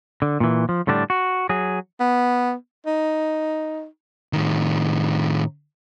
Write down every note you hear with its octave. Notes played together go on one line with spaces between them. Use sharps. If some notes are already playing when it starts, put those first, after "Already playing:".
D3
A#2 E3
F3
A2 D3 G3 D4
F#4
F#3 G#4
B3
D#4
A2 D#3